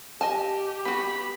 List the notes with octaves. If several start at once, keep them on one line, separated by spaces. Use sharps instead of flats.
G4 D#5 G#5 A5
B3 F#4 B5